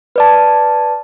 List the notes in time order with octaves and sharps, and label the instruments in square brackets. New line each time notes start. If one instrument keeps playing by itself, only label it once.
[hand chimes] B4 D5 A5